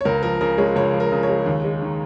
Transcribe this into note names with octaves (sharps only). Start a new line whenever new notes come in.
C#5
C#2 A#4
F3 A#4
C#3 A#4
G#3 C#5
C#2 C#5
F3
A#4
C#3
C#5
G#3
D#2
G#3
D#3